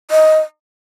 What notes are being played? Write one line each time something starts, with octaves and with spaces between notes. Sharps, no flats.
D#5